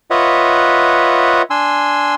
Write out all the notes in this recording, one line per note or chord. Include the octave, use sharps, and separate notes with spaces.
F4 B4 C#5 D#5 E5 F#5
D4 G#5 C6 E6